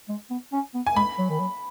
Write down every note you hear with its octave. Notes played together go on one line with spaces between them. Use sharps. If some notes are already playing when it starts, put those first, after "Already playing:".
G#3
B3
C#4
B3
G#5
G#3 B5
F#3
D#3
F#3